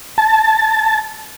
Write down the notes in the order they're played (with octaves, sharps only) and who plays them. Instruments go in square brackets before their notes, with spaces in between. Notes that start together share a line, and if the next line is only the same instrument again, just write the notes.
[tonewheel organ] A5